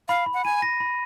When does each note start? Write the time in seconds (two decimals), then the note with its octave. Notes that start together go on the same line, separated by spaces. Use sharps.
0.08 F5 B5
0.26 B5
0.34 F#5
0.45 G#5 D#7
0.62 A#6
0.80 B5